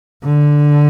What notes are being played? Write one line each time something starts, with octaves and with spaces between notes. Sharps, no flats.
D3